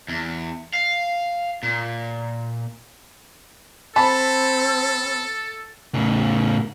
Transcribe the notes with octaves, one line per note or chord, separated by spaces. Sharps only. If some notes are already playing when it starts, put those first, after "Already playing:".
E2
F5
A#2
C4 A4 A5 B5
A2 C#3